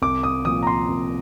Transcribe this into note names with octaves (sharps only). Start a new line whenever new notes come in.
C2 D6
D#6
A#2 F3 D#6
A#5
C6
C2